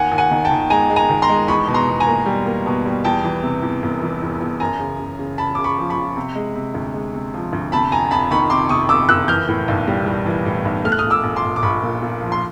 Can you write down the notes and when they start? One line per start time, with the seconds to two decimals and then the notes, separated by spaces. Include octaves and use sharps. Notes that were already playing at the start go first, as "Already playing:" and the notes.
Already playing: D#2 F#5 G#5
0.12 D#2
0.18 F#5 G#5
0.31 D#3
0.45 G5 A5
0.51 D#3
0.70 G#3 G#5 A#5
0.90 G#3
0.96 G#5 A#5
1.09 D#3
1.22 A#5 C6
1.29 G#3
1.48 E2 B5 C#6
1.68 B2
1.74 A#5 C6
1.87 B2
2.00 G#5 A#5
2.07 A#3
2.26 G3
2.46 A#3
2.66 B2
2.86 G3
3.04 E2 G5 A5
3.24 E3
3.43 C3
3.62 E2
3.83 E1
4.02 E3
4.22 E2
4.41 E2
4.60 F#2 G#5 A#5
4.80 C#3
5.00 C#3
5.19 C#3
5.38 C#3 A5 B5
5.55 C#3 D6
5.64 B5 C#6
5.78 F3
5.90 B5 C#6
5.97 F3
6.16 C3
6.35 G#3
6.55 C3
6.74 D2
6.94 G#3
7.14 C3
7.34 F3
7.53 D2
7.72 C3 A5 B5
7.92 F2 G#5 A#5
8.11 F2 A5 B5
8.31 D#3 B5 C#6
8.50 C3 C6 D6
8.69 C3 C#6 D#6
8.89 F2 D6 E6
9.09 F#1 E6 F#6
9.28 E3 F6 G6
9.48 A2
9.68 B1
9.87 G3
10.06 G3
10.26 E3
10.45 A2
10.65 B1
10.85 A3 F6
10.92 F#6
10.99 D#6 F6
11.04 A#1
11.10 D6 E6
11.24 A#1
11.36 C6 D6
11.43 A#1
11.56 D6
11.63 A#1 B5 C#6
11.83 A#2
12.02 A#2
12.21 F3
12.32 C6